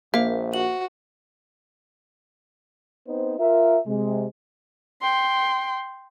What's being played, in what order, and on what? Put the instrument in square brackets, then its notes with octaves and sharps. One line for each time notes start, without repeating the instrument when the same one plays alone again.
[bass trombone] A#1 [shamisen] A#3 [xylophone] C5 E5
[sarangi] F#4 [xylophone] F#7
[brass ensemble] B3 C4 D#4 C5
F4 A#4 E5
C3 G#3
[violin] G5 C6